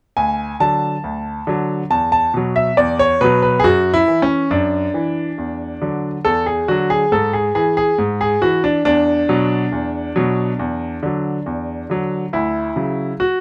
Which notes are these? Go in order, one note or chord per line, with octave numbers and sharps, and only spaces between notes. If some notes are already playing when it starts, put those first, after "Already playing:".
D2 G#5
D3 F#3 A5
D2
D3 F#3
E2 A5
A5
B2 F#3
E5
E2 D5
C#5
B2 F#3 B4
B4
G#4
F#2 F#4
E4
E3
C#4
F#2 D4
E3
E2
D3 F#3
E2 A4
G#4
D3 F#3 F#4
G#4
G#2 A4
G#4
E3 G#4
G#4
G#2
G#4
E3 F#4
D4
E2 D4
B2 F#3
E2
B2 F#3
E2
D3 F#3
E2
D3 F#3
D2 E4
C#3 F#3
F#4